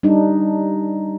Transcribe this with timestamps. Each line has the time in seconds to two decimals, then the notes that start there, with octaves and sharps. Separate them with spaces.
0.03 G3 D4 D#4